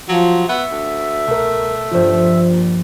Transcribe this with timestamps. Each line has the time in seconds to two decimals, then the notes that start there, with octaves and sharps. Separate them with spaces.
0.09 F3 F#3
0.49 B3 F#4 E5
0.71 D2
1.27 C2 B2 A3 A#4
1.91 G2 F3 F4 C5
2.50 A#2